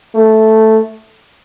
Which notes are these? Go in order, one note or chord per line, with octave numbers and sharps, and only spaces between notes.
A3